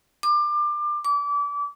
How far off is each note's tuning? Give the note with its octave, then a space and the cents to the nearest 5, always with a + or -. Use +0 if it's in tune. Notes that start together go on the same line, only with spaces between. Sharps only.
D6 +25
D6 -30